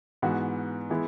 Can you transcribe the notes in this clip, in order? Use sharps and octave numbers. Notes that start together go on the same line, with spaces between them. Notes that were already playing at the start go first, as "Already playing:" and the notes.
G#2 E3 B3 F#4
E3 G#3 B3 E4